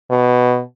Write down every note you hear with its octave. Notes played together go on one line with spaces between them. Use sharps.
B2